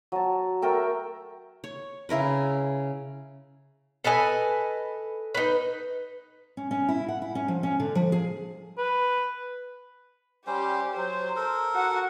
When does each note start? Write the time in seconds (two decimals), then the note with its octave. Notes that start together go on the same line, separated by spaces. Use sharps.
0.12 F#3 A5
0.62 A3 A#4 G5 E6
1.64 C#5
2.09 C#3 E4 A#4 B4
4.04 A4 B4 D#5 G#5
5.35 D#4 B4
6.57 C#4
6.71 C#4
6.89 E4
7.08 F#5
7.22 E4
7.35 C#4
7.48 F3
7.63 C#4
7.80 D3
7.95 F3
8.12 G#4
8.78 B4
10.47 G3 C#4 G4 C5
10.97 F#3 C5
11.36 A4 A#4
11.75 F#4 F#5